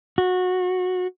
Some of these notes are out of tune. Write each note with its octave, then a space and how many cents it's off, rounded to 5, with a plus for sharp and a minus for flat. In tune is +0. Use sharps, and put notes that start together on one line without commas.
F#4 -20